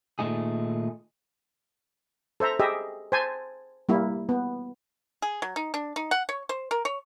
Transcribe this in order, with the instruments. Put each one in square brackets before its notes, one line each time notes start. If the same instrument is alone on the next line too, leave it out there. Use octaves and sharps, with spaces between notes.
[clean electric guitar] A#2 D#3 A3 D#4 G#4
[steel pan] A4 C5 E5 A#5
G4 G#4 D#5 E5
C5 G#5 A5
G3 A#3 E4
B3
[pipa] G#4
F#3
D#4
D4
D#4
F#5
C#5
C5
A#4
C#5